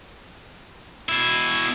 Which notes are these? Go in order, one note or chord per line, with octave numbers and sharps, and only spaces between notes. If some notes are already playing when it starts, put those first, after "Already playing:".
B2 E4